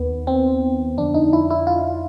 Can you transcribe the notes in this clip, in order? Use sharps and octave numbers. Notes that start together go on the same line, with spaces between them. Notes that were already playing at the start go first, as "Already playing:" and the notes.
Already playing: D#2 D#3 B3
C4
F2 D3 D4
D#4
E4
E4
F4